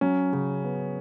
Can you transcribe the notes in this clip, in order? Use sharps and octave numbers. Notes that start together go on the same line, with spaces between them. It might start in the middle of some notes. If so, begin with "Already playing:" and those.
F#3 C#4
C#3
B3